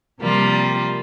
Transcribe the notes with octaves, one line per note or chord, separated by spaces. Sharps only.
C3 F3 G3 A#3 F4